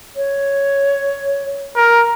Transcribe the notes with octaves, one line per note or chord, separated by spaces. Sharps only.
C#5
A#4